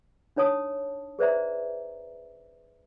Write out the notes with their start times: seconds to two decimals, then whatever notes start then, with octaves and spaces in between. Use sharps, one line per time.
0.36 D4 D#4 C#5 A5 D#6
1.19 G#4 B4 C5 D5 E5 A#5